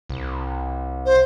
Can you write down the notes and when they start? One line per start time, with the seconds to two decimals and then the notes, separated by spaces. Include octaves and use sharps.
0.10 C2
1.06 C5